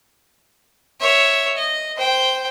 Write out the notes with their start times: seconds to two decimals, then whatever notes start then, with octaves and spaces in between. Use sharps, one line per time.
1.00 C#5 E5
1.57 D#5
1.97 C5 G5